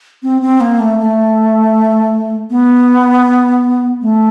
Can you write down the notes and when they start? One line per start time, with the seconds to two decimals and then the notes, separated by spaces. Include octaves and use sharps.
0.23 C4
0.42 C4
0.60 A#3
0.79 A3
0.99 A3
2.50 B3
4.02 A3